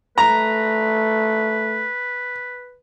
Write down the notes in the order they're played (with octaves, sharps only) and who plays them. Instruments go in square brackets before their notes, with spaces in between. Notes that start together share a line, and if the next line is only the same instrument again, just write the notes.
[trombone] A3 [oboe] B4 [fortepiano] A#5